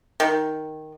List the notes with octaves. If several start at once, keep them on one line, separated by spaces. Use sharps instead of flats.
D#3